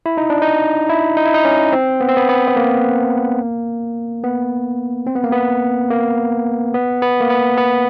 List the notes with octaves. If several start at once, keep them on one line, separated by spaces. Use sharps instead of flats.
E4
D#4
D4
D#4
E4
D#4
E4
D#4
C#4
C4
B3
C4
B3
B3
B3
A#3
B3
C4
B3
A#3
B3
A#3
B3
B3
A#3
B3
B3